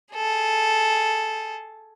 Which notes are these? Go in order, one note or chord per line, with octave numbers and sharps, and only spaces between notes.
G#4 A4